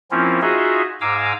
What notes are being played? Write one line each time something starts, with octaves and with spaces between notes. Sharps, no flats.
F3 A#3 C4 C#4 E4 F4
D#4 F4 F#4 G#4 D#5 E5
G#2 F5 G#5 A#5 D6 E6